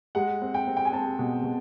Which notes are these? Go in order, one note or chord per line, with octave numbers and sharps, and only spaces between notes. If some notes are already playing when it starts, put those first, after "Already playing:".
G#3 F#5
C4
G5
C4
G5
G#5
C4 A5
B2
B2